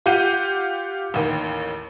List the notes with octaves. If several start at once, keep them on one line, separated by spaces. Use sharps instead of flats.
F4 G4 F#5 G6 D#7
A1 D#2